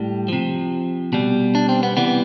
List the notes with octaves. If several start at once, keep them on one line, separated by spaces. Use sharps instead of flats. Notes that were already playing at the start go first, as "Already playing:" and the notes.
Already playing: A2 G3
C3 F3
B2 G3
D4
C4
B3
C3 E3 G3 B3